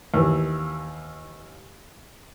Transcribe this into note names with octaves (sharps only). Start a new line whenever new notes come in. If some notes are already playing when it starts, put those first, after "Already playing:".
D#2 E3